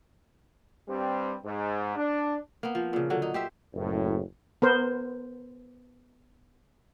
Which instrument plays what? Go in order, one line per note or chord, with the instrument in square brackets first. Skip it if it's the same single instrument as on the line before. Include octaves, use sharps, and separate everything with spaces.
[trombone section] G2 G3 C4
G#2
D4
[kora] A#3 B3
F3
A#2 C#3
D3 F#3
D#4
G4 C5 E5
[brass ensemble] F#1 F#2 A2
[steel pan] B3 A#4 C5